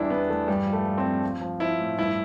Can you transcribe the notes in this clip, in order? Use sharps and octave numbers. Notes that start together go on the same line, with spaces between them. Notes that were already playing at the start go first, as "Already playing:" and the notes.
Already playing: E2 G3 D4 E4
E2 B3
E2 A3
G2 G3
F3
A3
F3
C4
F3
F3
F3
F3 E4
A2
G2 E4